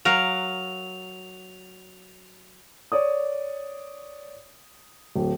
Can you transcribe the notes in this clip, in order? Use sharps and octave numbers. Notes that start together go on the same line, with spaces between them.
F#3 A#4 F5 F7
C#5 D5 D#6
D1